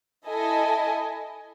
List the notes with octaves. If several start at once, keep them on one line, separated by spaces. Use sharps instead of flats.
E4 A4 D#5 G#5